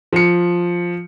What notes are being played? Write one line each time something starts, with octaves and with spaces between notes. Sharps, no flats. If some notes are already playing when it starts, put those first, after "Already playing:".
F3 C#7